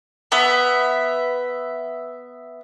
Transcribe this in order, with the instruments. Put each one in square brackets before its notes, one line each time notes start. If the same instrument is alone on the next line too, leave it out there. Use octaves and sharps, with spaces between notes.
[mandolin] B3 E5